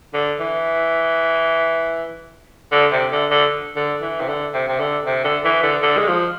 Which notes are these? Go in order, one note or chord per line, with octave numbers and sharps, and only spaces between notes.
D3
E3
D3
C3
D3
D3
D3
E3
C3
D3
C3
C3
D3
C3
D3
E3
D3
D3
G#3
F3